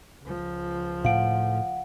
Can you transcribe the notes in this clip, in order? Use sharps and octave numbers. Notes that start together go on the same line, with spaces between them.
C#2 F3
A2 F5 F#5 D7